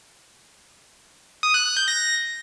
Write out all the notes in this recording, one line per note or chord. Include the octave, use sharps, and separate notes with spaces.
D#6
F#6
F#6
G6
A#6